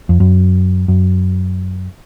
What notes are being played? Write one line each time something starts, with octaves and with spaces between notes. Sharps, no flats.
F2
F#2
F#2